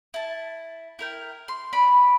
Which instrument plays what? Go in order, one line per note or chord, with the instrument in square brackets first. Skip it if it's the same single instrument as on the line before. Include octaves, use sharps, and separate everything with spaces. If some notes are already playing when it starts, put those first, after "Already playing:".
[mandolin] E4 A5
E4 A#4 G5
C6
B4 D5 B5